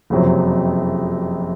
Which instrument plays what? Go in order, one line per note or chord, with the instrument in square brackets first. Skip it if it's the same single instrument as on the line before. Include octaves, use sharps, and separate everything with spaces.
[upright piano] F#1 F2 C3 F#3 C4